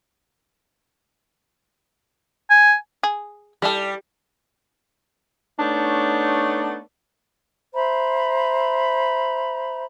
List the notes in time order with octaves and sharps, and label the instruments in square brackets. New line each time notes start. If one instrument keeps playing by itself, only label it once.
[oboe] G#5
[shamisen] G#4
[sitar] G3 [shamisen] E4 A4
[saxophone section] A3 B3 D4 D#4 C#5
[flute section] C5 E5 A#5 B5